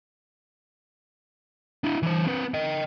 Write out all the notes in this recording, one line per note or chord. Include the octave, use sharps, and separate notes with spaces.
D4 E4
E3 C5
C4 B4
D#5 G5